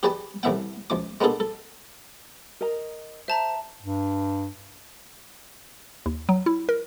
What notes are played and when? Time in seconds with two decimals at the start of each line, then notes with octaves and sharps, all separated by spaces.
0.03 G4 G#4 B4 D5 G5 A5
0.43 C2 A2 E3 E5 F#5 G5
0.90 C#2 F3 D6
1.21 G#3 A#3 B3 D4 G#4 A4
1.40 A4
2.61 A#4 D#5 A#5
3.28 C5 E5 A5 A#5
3.82 G2
6.06 D#2
6.29 F#3
6.46 E4
6.69 A#4